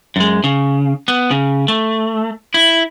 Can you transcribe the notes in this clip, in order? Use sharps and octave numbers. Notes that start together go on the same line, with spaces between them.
F#2 G#3
C#3
B3
C#3
A3
E4